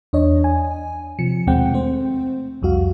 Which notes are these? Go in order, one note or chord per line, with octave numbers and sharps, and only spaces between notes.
E2 D4 C#5 D#5
G#5
C3 F3 C#7
D#2 B2 G#3 C4 F#5 G5
A3 C4 C5
C2 F2 G3 F#4 F5